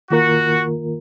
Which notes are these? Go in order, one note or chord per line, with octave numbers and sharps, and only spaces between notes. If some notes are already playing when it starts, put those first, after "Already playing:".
D#3 A#3 F4 F#4 A#4